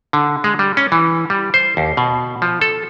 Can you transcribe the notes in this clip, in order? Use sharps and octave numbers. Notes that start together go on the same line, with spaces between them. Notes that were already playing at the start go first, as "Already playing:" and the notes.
D3
G#3
G3
C#4
E3
G3
C5
D#2
B2
F3
A4